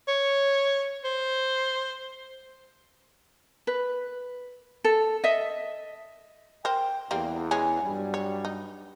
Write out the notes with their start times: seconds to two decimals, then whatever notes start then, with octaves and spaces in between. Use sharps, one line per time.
0.08 C#5
1.04 C5
3.67 B4
4.84 A4
5.24 D#5 E5
6.65 A#4 C5 G5
7.11 E2 G3 A#3 C4
7.51 G#3 C#4 G#4
7.83 G2 F#3 G3
8.14 C#5
8.45 D#4